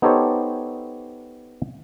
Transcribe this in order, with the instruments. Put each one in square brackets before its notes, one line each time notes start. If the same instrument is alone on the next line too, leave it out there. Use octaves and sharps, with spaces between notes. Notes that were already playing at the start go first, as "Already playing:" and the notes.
[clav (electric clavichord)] B3 D#4 G4 A4 C5 C#5